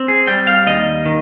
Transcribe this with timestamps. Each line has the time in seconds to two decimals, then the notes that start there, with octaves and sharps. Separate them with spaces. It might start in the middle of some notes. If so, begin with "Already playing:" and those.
Already playing: C4
0.08 G#4
0.27 G3 G5
0.47 F5
0.67 D#2 D#5
1.06 D#3